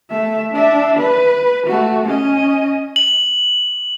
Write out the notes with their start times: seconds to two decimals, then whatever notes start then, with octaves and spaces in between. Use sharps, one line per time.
0.10 A3 E5
0.53 D4 E5
0.97 B4
1.67 A3 F#4
2.05 C#4 D#5
2.96 F#7